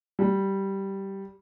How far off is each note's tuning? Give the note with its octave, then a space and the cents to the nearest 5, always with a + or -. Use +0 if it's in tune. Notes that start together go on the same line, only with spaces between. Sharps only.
G3 -10